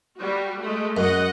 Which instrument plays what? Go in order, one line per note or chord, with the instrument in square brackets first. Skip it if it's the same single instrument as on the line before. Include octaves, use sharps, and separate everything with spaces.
[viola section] G3 F#4
G#3 A3
[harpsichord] F#2 [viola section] D#5 F#5